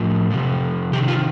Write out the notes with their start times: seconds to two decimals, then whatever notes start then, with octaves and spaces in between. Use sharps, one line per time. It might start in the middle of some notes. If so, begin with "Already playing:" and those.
Already playing: A2 F3
0.31 C3 F3
0.93 C3 G4
0.96 D#3
1.08 F4